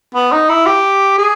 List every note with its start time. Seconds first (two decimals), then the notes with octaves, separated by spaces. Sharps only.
0.15 B3
0.32 D#4
0.49 E4
0.66 G4
1.18 G#4